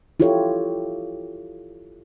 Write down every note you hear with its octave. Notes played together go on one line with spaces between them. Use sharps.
E4 F4 G4 A4 C#5